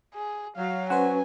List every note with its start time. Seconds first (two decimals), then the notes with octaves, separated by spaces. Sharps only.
0.14 G#4
0.57 F#3 F5
0.90 C#4 B4 C5 F#5 G#5